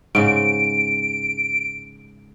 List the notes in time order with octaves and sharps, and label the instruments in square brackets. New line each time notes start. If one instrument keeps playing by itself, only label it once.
[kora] G#2 C#3 [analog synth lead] D7